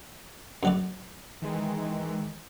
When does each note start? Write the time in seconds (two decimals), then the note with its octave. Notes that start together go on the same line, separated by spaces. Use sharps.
0.63 F#2 F#3 D5
1.42 D#3 E3 G#3